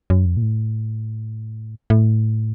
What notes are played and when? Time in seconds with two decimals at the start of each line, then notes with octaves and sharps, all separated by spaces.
0.10 F#2
0.26 F2
0.37 A#2
0.42 A2
1.90 A2